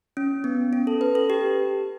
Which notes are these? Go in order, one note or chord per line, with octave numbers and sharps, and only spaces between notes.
C#4
B3
C#4
A4
B4
A4
G4